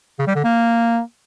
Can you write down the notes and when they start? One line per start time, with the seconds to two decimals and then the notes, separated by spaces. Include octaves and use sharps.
0.19 C#3
0.27 G3
0.36 D3
0.44 A#3